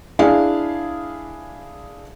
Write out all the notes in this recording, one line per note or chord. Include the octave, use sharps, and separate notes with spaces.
D4 E4 G#4 F5